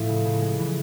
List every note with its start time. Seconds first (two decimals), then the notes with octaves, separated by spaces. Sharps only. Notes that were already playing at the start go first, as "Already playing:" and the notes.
Already playing: A2 F3 A3
0.09 C#3
0.25 C#3
0.42 G#3
0.58 E3